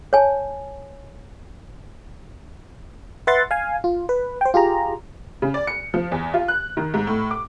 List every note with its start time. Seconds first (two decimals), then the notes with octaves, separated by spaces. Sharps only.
0.13 C#5 G#5 A5
3.27 B4 E5 F#5 C6 A6
3.51 F5 G#5
3.84 F4
4.09 B4
4.41 C5 G5
4.54 F4 G4 G#4 A#5
5.42 C#3
5.54 D5
5.67 C#7
5.94 F3
6.12 E2
6.34 F4
6.48 F#6
6.77 D#3
6.94 G#2
7.07 A2
7.31 D6